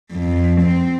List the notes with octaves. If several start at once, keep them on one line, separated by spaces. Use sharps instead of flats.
F2
C4